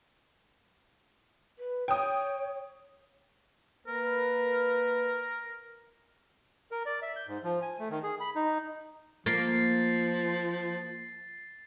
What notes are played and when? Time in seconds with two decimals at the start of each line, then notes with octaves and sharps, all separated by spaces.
1.59 B4
1.88 C#5 G5 D#6
3.87 A#3 A#4 B4
6.71 A#4
6.86 D5
7.02 E5
7.16 G6
7.28 G#2
7.44 F3
7.62 G#5
7.79 A3
7.91 D#3
8.03 G#4
8.20 B5
8.36 D#4
9.26 F3 A#3 A6 C7